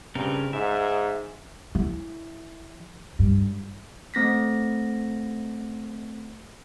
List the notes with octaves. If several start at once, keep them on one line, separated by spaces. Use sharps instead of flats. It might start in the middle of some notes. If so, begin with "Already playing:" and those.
G2 C#3 C4 A#4
G#2 E5
E3
G2
A3 C4 A#6 B6